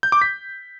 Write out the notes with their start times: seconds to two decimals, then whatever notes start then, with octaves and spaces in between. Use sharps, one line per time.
0.03 G6
0.12 D6
0.22 B6